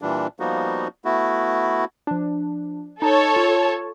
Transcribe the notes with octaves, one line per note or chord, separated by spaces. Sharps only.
A#2 E3 G3 D4
F3 G3 A#3 B3 D#4 F#4
A3 B3 E4 F#4
F3 D4
D#4 A4 C#5
F4